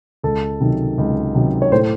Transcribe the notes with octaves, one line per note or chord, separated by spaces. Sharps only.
C#2 A4
C3 D#3 F#3
C#2
C3 D#3 F#3
C#5
A2 C5